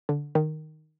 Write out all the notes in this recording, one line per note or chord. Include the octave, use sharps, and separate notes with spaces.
D3
D#3